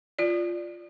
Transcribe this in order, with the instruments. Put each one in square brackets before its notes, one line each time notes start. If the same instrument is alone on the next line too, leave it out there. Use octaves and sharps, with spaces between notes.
[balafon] F4 D5